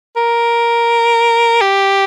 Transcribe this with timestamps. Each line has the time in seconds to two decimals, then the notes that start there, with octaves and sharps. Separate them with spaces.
0.17 A#4
1.61 G4